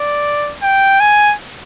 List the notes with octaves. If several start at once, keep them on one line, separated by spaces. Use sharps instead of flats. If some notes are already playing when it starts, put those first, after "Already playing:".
Already playing: D5
G5
G#5